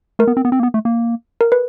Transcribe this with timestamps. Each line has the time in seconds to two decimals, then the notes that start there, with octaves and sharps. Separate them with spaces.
0.19 A3 A#4
0.27 B3
0.37 C4
0.45 B3
0.52 C4
0.60 A#3
0.63 B3
0.74 A3
0.85 A#3
1.41 A#4
1.52 B4